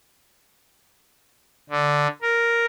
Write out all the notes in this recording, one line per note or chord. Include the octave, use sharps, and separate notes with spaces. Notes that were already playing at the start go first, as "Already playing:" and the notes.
D3
A#4